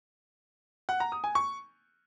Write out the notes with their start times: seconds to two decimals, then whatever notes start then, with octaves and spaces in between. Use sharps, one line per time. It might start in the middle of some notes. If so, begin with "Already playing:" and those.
0.89 F#5
1.00 A#5
1.12 D#6
1.24 G#5
1.35 C#6